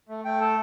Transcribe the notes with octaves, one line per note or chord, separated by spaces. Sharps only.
A3
A3 G5
A4 A5